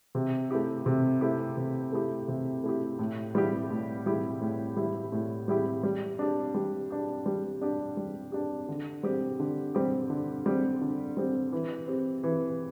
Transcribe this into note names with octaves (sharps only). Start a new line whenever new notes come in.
C3
A3 E4 G4
C3
A3 E4 G4
C3
A3 E4 G4
C3
A3 E4 G4
A2
G3 E4 G4
A2
G3 E4 G4
A2
G3 E4 G4
A2
G3 E4 G4
G3
D4 G4
G3
D4 G4
G3
D4 G4
G3
D4 G4
D3
G3 C4 G4
D3
G3 C4 G4
D3
G3 C4 G4
D3
G3 C4 G4
E3
C4 G4
E3